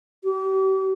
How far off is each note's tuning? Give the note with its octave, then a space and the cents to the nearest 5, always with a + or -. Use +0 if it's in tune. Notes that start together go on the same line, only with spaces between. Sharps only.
G4 -40